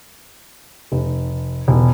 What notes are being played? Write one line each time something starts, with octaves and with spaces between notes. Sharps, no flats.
F1
E1